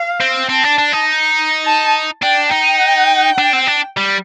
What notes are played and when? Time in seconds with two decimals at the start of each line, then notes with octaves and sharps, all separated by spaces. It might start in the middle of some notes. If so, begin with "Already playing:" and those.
Already playing: F5
0.20 C4
0.49 C4 A5
0.64 D4
0.78 D4
0.92 D#4
1.65 A5
2.23 D4 G5
2.52 D#4 G5
3.38 D4
3.53 C4
3.67 D4
3.97 G3